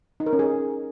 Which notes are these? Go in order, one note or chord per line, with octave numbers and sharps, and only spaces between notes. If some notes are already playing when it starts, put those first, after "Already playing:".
D#4
A#4
C#4
G#4